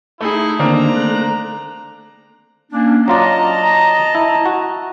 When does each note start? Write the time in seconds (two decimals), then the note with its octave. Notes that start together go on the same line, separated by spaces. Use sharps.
0.21 A3 D#4 E4 G#4
0.59 D3 D#3 A#3 C4 D4 A#5
0.95 A3 F#6
2.72 A#3 C#4 D4
3.08 F#3 F4 D5 D#5 A5 A#5
4.15 E4
4.46 F#4